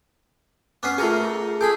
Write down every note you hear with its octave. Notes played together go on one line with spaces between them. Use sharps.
B3 C#4 B4 D6 F6 C7
A3 F4 G#4 A#4 G#5
G#4 A4 B5 C6 D6 G6